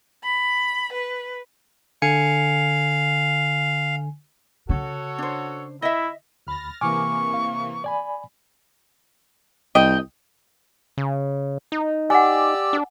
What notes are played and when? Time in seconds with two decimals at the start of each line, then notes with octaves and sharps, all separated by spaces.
0.22 B5
0.92 B4
2.02 D3 F5 G#5 C#7
4.69 C#3 F#4 A4 C#5
5.18 D4 C5
5.82 E4 D#5 E5
6.47 D2 B5 F6 A6 A#6
6.81 C3 E3 A#3 G#5 C#6 D6 F6
7.34 F5
7.84 D5 G#5 B5
9.75 C2 D#5 G5
10.98 C#3
11.72 D#4
12.10 G4 D5 F#5 G#5 E6
12.73 D4